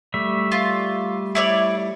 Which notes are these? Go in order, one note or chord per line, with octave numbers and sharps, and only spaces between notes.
G3 A3 E5
F4
E4 C#5 D5